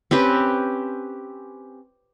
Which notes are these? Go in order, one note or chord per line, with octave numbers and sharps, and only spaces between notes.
C4 C#4 G4 B4